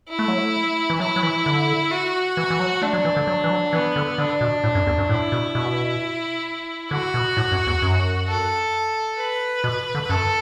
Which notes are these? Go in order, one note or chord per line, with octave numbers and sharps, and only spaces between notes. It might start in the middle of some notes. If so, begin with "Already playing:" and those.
E4
A3
F#3
A3
E3
F#3 E4
F#3
E3
D3
F#4
E3
E3
F#3
A3 D4
F#3
E3
D3
F#3
E3
F#3
E3 B3
D3
D3 D4
B2
A2
F#2
E2
F#2
A2 E4
B2
B2
D3 F#4
B2
A2
F#2
E2
F#2
A4
B4
B2
D3
F#2 A4